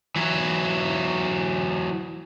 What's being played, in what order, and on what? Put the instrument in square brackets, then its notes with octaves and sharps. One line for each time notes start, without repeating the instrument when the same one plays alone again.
[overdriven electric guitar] E3 F#3